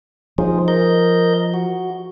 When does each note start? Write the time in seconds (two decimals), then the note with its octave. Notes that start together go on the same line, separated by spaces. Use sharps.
0.38 F3 D#4 G#4 C5
0.68 A#4 D#5 G6
1.54 F#4